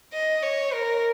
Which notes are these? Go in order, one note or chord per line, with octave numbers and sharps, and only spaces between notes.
D#5
C#5
A#4